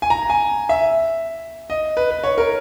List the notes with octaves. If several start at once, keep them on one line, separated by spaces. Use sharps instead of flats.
G#5
A#5
G#5
E5
D#5
B4
B4
C#5
A#4